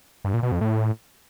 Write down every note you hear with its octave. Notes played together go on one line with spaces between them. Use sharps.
G2
A#2
B2
F2
A2